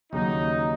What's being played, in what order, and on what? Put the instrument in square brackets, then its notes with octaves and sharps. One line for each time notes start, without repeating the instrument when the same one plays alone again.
[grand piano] D#2 C#3 F#3 [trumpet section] D#4